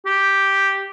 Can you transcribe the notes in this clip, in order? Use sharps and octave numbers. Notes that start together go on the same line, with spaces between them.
G4